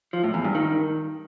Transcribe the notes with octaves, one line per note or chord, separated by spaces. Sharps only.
F3
A2
E2
G2
D#3